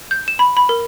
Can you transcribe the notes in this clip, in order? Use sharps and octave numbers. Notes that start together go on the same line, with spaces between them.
G6
E7
B5
B5
A#4